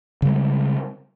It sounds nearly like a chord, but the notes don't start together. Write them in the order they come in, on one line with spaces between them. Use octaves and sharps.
C#3 G3 G#3